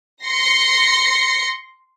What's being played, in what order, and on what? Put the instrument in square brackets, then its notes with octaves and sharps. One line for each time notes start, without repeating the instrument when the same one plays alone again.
[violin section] C6 A#6 C7 C#7